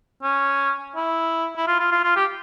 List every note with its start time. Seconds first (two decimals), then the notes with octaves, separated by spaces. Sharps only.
0.22 C#4
0.96 E4
1.57 E4
1.67 F4
1.79 F4
1.91 F4
2.03 F4
2.16 G4